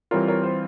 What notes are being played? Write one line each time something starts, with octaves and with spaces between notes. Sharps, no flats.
E3 G3 C4 F4 A#4 C#5
A#4 C#5
C5